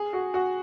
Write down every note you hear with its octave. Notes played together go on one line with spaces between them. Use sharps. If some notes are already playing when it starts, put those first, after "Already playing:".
Already playing: G#4
F#4
F#4